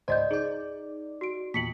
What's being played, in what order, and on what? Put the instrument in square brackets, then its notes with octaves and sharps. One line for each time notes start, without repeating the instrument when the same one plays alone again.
[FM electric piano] C#2 G#2 C5 [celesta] D5 D#5 G6
[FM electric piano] D#4 D5 [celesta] G#4
[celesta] F#4 D7
[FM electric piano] E2 A#2 [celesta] B6 C#7 F#7